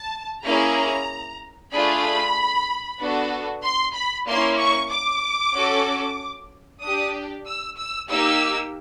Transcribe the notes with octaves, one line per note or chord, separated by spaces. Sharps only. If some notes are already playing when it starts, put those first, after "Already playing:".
Already playing: A5
A#3 C#4 E4 G#4 A#5
A3 D4 F4 G#4 B5
B3 D4 F#4 A4
C6
B5
A#3 C#4 E4 C6
C#6
D6
C#4 F#4 A4
D4 G4 D#6
E6
E6
A#3 D#4 G4 E6